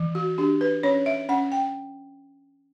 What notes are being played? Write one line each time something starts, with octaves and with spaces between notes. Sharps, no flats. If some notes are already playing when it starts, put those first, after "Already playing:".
Already playing: E3
F#4
D4 G4
B4
C#4 C#5
E5
C#4 F#5
G5